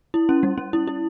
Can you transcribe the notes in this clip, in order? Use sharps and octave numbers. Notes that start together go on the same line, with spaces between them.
E4
C#4
G3
C#4
E4
E4